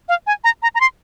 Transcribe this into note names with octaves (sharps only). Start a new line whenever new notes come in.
F5
G#5
A#5
A#5
A#5
C6